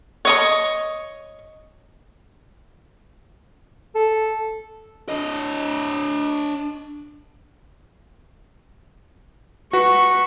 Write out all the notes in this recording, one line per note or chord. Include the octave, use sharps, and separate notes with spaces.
C#5 D#5 C#6
A4
D4 D#5
F#4 B4 C#6